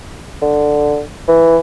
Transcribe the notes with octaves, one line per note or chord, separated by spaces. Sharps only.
D3
E3